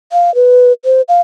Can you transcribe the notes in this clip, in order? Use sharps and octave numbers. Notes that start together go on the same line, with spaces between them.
F5
B4
C5
F5